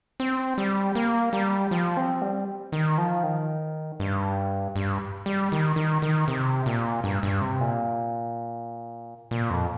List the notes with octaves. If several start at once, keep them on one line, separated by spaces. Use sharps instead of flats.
C4
G3
A#3
G3
F3
C4
G3
D#3
F3
D#3
G2
G2
G3
D#3
D#3
D#3
C3
A#2
G2
G2
C3
A#2
A#2
F2